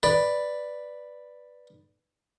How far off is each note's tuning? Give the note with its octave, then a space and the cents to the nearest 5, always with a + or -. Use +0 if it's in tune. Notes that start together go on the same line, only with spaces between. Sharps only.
B4 +0 D5 +5